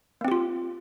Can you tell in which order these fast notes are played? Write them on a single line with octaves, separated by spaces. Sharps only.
A#3 C4 G4 F4